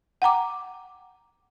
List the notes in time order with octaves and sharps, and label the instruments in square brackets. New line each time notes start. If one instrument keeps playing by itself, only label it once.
[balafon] F#5 G5 A#5 D6